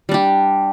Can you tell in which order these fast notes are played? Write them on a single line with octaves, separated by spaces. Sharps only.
G3 D4 G4